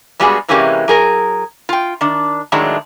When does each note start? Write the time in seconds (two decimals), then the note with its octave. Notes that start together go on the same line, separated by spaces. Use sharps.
0.20 G2 G3 G#3 B3 F#4 G#4
0.48 C3 E3 G#3 A#3 C#4 G4
0.88 F#3 G#4 A#4
1.69 F4 G5
2.01 D#3 D4
2.52 A2 D#3 F#3 G#3 D4